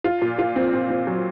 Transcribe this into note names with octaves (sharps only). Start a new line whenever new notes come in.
F4
A#2
F4
C4
C4
C4
F#3